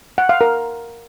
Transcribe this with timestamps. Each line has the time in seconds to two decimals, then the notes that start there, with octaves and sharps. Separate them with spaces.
0.18 F#5
0.29 F5
0.41 A#4